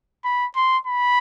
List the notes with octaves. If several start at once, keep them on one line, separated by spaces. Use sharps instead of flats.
B5
C6
B5